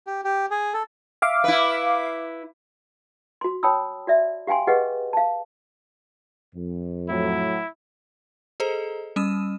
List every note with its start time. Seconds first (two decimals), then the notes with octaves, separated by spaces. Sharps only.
0.07 G4
0.24 G4
0.51 G#4
0.74 A4
1.22 E5 F5 D6
1.44 E4 B4
3.41 F#4 C6
3.63 C#5 G5 A5 B5 D#6 E6
4.07 F#4 D5 E5
4.47 G4 F5 G5 G#5 C6
4.67 G4 G#4 B4 D#5 F#5
5.13 F5 A5
6.54 F2
7.09 A2 F#3 E4
8.60 G#4 A4 C5 D#5 A#5
9.16 G3 C#4 D#6 E6 D#7 E7